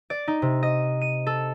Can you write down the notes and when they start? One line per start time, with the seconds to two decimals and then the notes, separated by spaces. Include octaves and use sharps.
0.10 D5
0.28 D#4
0.42 C3
0.63 D#5
1.01 D#7
1.27 A4